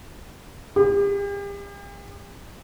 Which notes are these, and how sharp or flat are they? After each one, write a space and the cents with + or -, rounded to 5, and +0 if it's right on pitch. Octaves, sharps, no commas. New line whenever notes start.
G4 +40